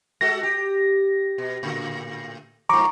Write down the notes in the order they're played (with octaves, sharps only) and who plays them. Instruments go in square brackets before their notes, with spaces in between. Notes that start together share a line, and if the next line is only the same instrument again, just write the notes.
[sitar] G#3 F#4 A4 [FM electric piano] A#6
[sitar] G4
B2
A2 D3
[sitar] G2 F3 [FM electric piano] A#5 C#6 D6